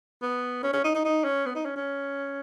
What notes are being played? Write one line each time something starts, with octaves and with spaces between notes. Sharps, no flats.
B3
C#4
C#4
D#4
D#4
D#4
C#4
B3
D#4
C#4
C#4